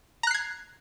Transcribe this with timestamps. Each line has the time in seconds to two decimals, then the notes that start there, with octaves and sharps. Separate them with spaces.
0.23 A#5
0.27 F#6
0.31 C7
0.34 G#6